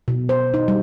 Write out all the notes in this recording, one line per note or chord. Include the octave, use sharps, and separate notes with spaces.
B2
C5
D#4
G3